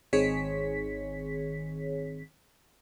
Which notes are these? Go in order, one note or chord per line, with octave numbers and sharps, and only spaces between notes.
G#1 D#3 C4 G#4 C#5 B6